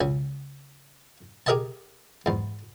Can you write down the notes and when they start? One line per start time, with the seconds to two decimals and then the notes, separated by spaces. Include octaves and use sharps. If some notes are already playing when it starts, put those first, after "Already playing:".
0.01 C#2 C#4
1.46 G4 G#4 A#4 D#5 G#5 A5
2.26 E2 G#2